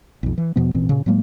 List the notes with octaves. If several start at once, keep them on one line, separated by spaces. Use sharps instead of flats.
B1 F2
E3
E2 B2 F3 B3
A1 A#2 E3 C4
A#2 C#3
A2 F#3 G#3 A#3